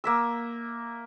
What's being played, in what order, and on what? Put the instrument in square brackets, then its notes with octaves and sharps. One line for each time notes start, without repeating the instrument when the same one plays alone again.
[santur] A#3 E5 E6